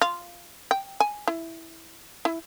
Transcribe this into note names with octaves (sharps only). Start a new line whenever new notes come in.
F4
G5
G#5
E4
E4